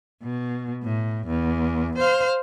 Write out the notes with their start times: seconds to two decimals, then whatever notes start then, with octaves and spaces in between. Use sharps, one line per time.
0.23 B2
0.83 A2
1.27 E2
1.98 C5 F5